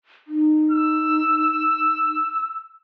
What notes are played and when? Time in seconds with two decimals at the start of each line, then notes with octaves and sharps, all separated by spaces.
0.28 D#4
0.71 E6